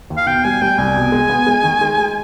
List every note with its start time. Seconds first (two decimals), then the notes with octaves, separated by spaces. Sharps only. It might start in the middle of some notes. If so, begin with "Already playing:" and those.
0.10 D#2
0.17 F5
0.27 B2 G5
0.44 G3 G#5
0.61 G3 G5
0.78 C2 G#5
0.96 B2
1.12 G#3
1.29 B3
1.47 G#3
1.64 D#3
1.81 G#3
1.98 G#3